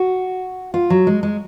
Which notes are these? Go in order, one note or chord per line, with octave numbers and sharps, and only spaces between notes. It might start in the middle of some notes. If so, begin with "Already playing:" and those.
Already playing: F#4
F4
F#3
G#3
G#3